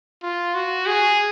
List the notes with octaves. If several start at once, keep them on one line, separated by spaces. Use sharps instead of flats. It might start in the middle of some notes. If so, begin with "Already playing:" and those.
F4
F#4
G#4